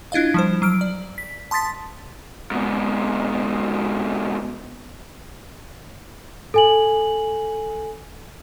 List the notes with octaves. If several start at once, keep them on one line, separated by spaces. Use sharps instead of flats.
D4 E4 F4 D#5 F5
F3 G3 C5
F#3 F6 D7
D5
B6
A5 C6 D#6 A6 B6
G#2 B2
A4 G#5 F#7